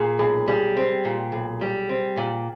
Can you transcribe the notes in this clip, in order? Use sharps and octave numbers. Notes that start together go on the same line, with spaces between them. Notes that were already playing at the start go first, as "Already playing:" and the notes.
Already playing: A#2 G#4
B1 G#4
G3 G#4
C4
A#2
B1
G3
C4
A#2